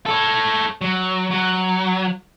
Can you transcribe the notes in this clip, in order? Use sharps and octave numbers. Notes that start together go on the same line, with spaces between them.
A4 C#5
F#3
F#3